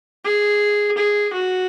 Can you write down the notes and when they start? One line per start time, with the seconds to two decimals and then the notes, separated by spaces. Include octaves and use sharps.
0.25 G#4
0.98 G#4
1.33 F#4